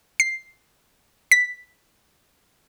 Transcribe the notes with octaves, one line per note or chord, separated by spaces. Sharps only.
C7
B6